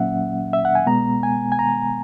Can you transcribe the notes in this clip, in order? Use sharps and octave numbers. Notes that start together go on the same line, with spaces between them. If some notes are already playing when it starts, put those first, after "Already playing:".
Already playing: A#2 F#3 A#3 C#4 E5 F#5
E5
F#5
G#5
B2 G#3 B3 A#5
G#5
G#5
A#5